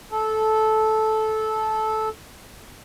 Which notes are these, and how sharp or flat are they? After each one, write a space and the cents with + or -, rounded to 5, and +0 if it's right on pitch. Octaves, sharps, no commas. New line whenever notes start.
A4 -15